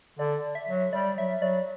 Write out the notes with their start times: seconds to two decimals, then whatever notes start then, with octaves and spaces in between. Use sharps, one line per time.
0.19 D3 D5
0.55 E5
0.68 F#3
0.93 G3 D5
1.17 F#3 E5
1.42 F#3 D5